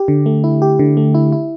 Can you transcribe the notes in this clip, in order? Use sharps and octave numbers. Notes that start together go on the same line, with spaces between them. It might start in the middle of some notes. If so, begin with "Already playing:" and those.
Already playing: G4
D3
A3
E4
G4
D3
A3
E4
E4